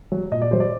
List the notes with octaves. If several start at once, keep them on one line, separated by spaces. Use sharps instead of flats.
F#3
A#2 D#5
D5
F#3 C5
D5